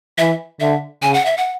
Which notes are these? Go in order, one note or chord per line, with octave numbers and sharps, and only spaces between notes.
E3 E5
D3 E5
C#3 G#5
F#5
E5
F#5